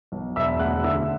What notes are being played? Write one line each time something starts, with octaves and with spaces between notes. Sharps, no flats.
B1
E1 E5 E6
D2 F#5 F#6
D3 E5 E6